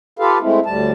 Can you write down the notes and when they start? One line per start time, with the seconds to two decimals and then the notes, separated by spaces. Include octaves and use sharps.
0.19 F4 G4 A4 B4 F5
0.42 G#3 A3 C4 E4
0.66 D2 A2 G3 A5